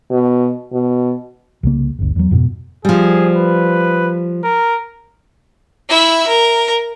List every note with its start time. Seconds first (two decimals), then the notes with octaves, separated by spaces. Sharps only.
0.11 B2
0.73 B2
1.63 C2 C#3 A#3
1.99 G1 D2
2.16 E2 F#3
2.31 F2 G#2 B2
2.85 F3 G3 G#4
3.36 B4
4.44 A#4
5.89 E4 E5
6.27 A#4